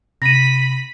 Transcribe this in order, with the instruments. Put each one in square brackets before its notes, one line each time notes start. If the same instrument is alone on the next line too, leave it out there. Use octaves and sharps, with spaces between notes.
[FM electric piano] C3 [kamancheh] B5 [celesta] A#6 D#7